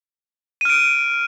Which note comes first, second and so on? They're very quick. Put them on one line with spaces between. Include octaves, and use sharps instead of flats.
D#7 F6 D7